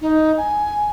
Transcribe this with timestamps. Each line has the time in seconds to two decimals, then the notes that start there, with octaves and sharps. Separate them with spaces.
0.01 D#4
0.37 G#5